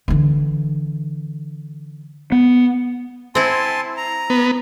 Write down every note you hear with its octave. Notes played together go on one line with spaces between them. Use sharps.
D3 E3
B3
C4 E4 G#5 A5 C6
A#5
B3